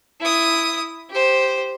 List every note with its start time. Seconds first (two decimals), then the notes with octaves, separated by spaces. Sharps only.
0.21 E4 D#6
1.10 G4 C5